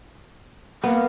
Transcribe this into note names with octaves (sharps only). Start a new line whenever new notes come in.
A#3 B3